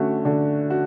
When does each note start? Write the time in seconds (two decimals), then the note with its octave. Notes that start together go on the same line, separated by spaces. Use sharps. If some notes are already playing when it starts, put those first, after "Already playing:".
Already playing: D3 A3 C#4 F#4
0.25 D3
0.70 F#4